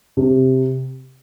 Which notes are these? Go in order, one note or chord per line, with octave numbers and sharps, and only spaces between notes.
C3